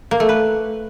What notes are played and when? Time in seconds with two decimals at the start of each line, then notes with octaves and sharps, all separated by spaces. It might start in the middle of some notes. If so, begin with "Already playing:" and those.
0.11 A#3
0.20 A3
0.29 B4